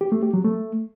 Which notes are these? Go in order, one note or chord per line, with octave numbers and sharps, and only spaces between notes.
G4
A3
G4
F#3
A3